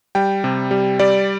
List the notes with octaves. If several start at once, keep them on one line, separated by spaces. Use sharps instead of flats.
G3 G5
C3
G3
G3 D5